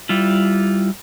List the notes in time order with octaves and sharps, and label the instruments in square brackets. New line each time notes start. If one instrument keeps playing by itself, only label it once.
[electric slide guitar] G3 E4 F4